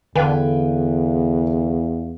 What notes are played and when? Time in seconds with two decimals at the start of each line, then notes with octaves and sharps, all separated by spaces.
0.16 E2 D3 B4 F5 G5 G#5